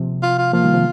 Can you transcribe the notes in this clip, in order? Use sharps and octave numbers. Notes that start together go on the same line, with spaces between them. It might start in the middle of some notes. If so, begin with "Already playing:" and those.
Already playing: C3 F3
F4
F4
F3 A#3 F4
D#3 G3
C3 F3